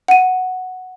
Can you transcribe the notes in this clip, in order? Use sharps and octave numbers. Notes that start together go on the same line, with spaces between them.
F#5 D#7